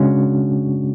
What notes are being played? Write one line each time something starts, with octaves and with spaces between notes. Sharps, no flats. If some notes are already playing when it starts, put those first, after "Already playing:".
Already playing: C#3 G#3 C#4 D4 F#4